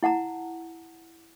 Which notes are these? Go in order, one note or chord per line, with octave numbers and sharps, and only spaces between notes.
E4 F#5 A5 A#5